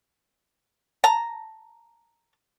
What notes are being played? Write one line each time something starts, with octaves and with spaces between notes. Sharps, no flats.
A5 A#5